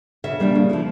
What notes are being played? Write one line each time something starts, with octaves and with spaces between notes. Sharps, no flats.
C#3 E5
G3 A#3 D4
C#3
F3 A#3 E4